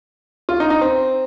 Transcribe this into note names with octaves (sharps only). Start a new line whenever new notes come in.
F4
D#4
D#4
C4